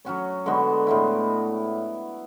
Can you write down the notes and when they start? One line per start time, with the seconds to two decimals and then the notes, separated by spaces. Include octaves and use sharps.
0.05 F#3 C#4 F#4 C#5
0.46 D3 G#3 B3 F#4
0.87 A2 G#3 B3 E4